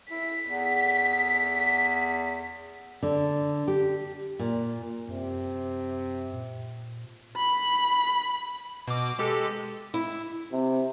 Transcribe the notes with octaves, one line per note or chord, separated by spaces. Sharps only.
E4 B6
E2
D3
G4
A#2
F#2 C3
A#2
B5
B2 D6
G#3 G4 A4
E4
C3